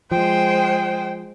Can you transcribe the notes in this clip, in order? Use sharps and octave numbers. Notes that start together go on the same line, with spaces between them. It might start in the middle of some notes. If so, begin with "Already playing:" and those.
F3 G#3 C5 G5